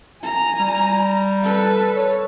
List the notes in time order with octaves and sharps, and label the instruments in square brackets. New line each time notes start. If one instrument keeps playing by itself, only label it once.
[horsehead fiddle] G#5 A#5
[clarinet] G3
[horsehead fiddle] A4 B4
[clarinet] C#5